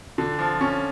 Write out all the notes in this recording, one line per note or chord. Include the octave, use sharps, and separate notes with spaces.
D3
F3
C#4